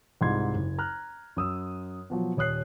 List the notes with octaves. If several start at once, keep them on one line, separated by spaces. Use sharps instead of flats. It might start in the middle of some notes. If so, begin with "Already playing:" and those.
C2 G#2 D#4 F4 C6 G#6
F#1
A#5 F6 F#6
F#2 D#6 E6
B2 F3 F#3
D#1 C#5 D#6 F#6 C7